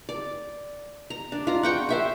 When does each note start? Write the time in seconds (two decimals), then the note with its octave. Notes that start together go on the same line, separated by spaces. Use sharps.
0.09 D5
1.10 A#5
1.32 D4
1.47 F4 A#5
1.63 F#5 G5 C#6
1.89 C5 E5 G5